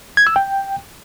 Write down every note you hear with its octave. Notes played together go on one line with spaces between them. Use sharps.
G#6
E6
G5